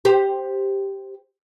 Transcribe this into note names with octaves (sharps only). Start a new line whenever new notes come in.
G4 C5